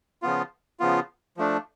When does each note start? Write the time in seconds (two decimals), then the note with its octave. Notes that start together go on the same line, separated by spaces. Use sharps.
0.22 C#3 F3 B3 F4
0.80 C#3 F3 B3 F4
1.37 F3 A3 D4